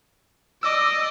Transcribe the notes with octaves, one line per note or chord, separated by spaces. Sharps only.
D5 D#5 D6 E6